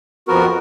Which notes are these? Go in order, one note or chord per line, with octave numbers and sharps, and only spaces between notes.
F2 F3 B3 F#4 A#4